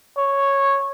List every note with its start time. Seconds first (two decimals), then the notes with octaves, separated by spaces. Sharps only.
0.18 C#5